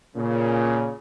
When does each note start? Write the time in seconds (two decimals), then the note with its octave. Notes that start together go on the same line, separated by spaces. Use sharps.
0.16 A#2 C#3